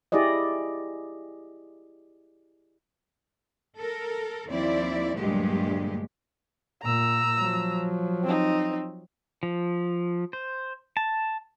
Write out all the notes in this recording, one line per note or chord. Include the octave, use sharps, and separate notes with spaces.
E4 G4 G#4 D5 D#5
A4 A#4
D#2 F3 C4 E4 D5
D2 G2 A#2 F#3 G#3 G4
A#2 A#5 E6
F3 F#3
C4 D#4
F3
C5
A5